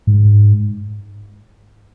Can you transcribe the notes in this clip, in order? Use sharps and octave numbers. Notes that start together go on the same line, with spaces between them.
G#2